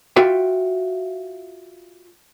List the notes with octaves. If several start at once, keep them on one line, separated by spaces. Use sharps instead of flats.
F4 F#4 E5 G5